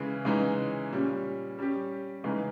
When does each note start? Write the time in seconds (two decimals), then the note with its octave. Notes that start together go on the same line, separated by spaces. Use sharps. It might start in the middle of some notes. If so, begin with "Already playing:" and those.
Already playing: C#3 E3 G#3
0.25 C#3 E3 G#3 D#4
0.92 A#2 G3 C#4
1.59 G3 C#4 G4
2.24 C#3 E3 G#3 D#4